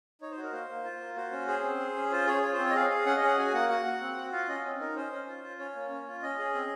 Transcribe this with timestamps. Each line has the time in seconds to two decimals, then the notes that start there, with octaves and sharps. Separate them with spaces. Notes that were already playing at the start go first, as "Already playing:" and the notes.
0.21 D#4 C#5
0.31 C5
0.37 F#4
0.43 A#4
0.52 A#3 C5
0.69 A#3
0.84 F4
1.00 A#3
1.16 F#4 C5
1.32 C#4
1.48 G#4 C5
1.63 C4
1.79 G#4
1.96 C#4
2.12 F4 C5
2.26 G#4 C#5
2.42 F4 C#5
2.53 C5
2.59 C4
2.64 C#5
2.70 D#5
2.74 G#4 F5
2.90 G#4
3.06 C#4 F#5
3.16 D#5
3.22 G#4 F#5
3.38 F#4 G#5
3.54 A#3 F#5
3.69 F#4 F#5
3.86 F#4
4.01 C4
4.17 F#4
4.32 F4 F5
4.48 C#4 D#5
4.65 C4
4.80 D#4 A#4
4.96 C#4 C5
5.12 C#4
5.28 F4
5.44 F4
5.59 C#4 C#5
5.76 A#3
5.90 C#4
6.07 F4
6.22 C#4 D#5
6.39 G#4
6.55 C4